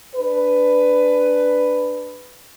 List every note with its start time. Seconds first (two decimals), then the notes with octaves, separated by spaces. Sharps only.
0.15 D4 G#4 B4